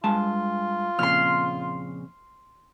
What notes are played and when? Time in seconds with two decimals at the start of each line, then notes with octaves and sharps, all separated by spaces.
0.04 G2 G#3 F4 A5
0.99 F2 A#2 C#3 C6 F6